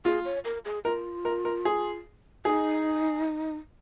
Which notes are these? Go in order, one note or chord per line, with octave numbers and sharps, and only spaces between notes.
F4 G#4
C#5
A#4
G#4
F4 A#4
A#4
A#4
G#4
D#4 G#4